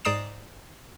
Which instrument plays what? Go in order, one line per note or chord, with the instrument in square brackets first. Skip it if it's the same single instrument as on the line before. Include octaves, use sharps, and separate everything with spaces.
[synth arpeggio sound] G#2 D5 A#5 D#6 C7 E7